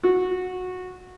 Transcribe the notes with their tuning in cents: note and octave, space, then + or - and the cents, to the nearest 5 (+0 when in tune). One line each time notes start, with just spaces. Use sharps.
F#4 -15